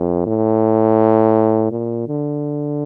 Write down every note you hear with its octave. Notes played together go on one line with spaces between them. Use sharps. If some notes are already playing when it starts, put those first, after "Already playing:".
Already playing: F2
A2
A#2
D3